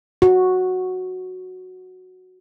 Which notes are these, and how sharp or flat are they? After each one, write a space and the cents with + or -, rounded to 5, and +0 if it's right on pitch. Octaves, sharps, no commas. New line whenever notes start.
F#4 -5